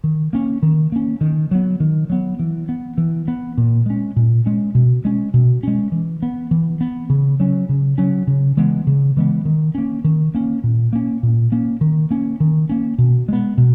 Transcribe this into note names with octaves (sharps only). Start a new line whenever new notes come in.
D#3
A#3 C#4
D#3
A#3 C#4
D#3
F#3 B3
D#3
F#3 B3
E3
B3
E3
B3
A#2
G#3 C#4
A#2
G#3 C#4
B2
G#3 C#4
B2
G#3 C#4
E3
B3
E3
B3
C#3
F#3 C#4
C#3
F#3 C#4
C#3
E3 G#3 B3
C#3
E3 G#3 B3
D#3
A#3 C#4
D#3
A#3 C#4
A#2
A#3 C#4
A#2
A#3 C#4
D#3
A#3 C#4
D#3
A#3 C#4
B2
G#3 B3
B2